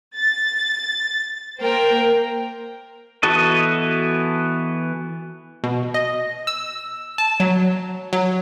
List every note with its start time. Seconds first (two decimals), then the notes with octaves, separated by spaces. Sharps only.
0.16 A6
1.59 A#3 A#4 C5 G5
3.23 E3 B3 F#4 A4 D#5
5.64 B2
5.94 D#5
6.47 E6
7.18 A5
7.40 F#3
8.13 F#3